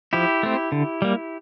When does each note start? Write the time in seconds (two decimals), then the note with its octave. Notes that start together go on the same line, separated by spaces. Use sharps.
0.13 F3 E4 G4
0.43 A3 C4
0.72 D3
1.02 G3 A#3